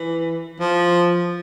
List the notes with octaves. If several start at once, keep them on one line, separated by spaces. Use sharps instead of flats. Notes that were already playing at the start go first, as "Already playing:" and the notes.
Already playing: E3
F3